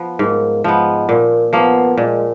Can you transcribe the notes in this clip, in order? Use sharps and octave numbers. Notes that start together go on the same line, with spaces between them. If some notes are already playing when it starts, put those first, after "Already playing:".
Already playing: F3 B3
G#2 A#3
F3 G#3 B3
A#2 A#3
F3 A#3 B3
A#2 G#3